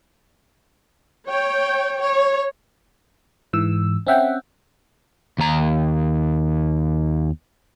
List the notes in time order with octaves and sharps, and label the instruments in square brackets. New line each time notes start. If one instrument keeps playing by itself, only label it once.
[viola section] C#5 G5
C#5
[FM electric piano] G#2 E3 E6
C4 C#4 E5 F#5 G5
[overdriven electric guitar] D#2 A#5